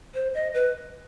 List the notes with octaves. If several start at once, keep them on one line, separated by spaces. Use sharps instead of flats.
C5
D#5
B4